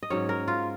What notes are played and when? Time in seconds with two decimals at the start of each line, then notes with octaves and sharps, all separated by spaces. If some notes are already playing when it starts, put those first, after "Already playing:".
0.03 D#5
0.10 G#2 F#3 C#4 C#5
0.29 A#4
0.48 F4